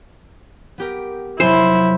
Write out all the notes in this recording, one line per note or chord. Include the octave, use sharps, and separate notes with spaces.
B3 G4 A#4
F1 F#3 E4 C5 G#5